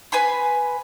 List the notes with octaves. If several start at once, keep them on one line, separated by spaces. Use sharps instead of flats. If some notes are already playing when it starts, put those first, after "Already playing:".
B4 G#5 B5 C6